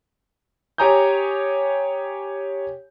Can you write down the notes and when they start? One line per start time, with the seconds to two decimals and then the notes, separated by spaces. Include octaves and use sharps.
0.78 G4 C#5 G#5 A#5 D#6 G6